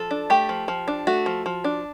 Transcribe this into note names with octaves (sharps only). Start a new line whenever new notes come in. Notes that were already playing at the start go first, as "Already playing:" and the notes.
Already playing: F3 A4
D4
A3 G4
F3
F3
D4
A3 F#4
F3
F3
D4